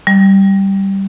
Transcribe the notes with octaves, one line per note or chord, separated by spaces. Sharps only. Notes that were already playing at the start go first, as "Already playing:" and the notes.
G3